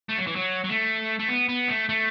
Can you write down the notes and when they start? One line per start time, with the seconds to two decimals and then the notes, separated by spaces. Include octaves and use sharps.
0.09 A3
0.18 F#3
0.27 E3
0.36 F#3
0.64 F#3
0.69 A3
1.20 A3
1.29 B3
1.49 B3
1.69 A3
1.89 A3